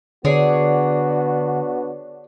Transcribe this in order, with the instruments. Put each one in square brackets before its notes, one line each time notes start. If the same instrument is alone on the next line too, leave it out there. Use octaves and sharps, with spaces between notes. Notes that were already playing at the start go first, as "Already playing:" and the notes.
[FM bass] D3 [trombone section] B3 D4 F#4 [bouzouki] G#4 C#5 D5